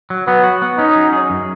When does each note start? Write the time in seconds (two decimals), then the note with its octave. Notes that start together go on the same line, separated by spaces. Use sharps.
0.10 F#3
0.27 F#3 B3
0.44 F#4
0.62 B3
0.78 C#4 D#4
0.96 F#3
1.13 G#4
1.30 F#2